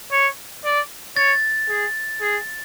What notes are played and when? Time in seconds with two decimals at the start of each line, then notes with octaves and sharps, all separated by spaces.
0.12 C#5
0.64 D5
1.17 C#5 A6
1.69 G#4
2.21 G#4